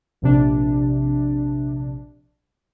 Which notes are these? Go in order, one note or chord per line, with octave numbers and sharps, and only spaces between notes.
A#1 C3 D4